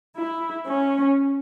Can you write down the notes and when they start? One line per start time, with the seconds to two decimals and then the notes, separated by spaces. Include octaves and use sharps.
0.18 E4
0.69 C#4